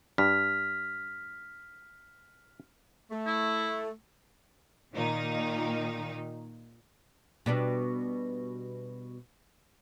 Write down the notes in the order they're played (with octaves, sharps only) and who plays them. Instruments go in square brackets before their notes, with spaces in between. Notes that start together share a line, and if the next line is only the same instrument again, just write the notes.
[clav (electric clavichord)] G2 [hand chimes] F6 B6
[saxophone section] A3
[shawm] E4
[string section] A#2 D#3 D#4
[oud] B2 G3 D4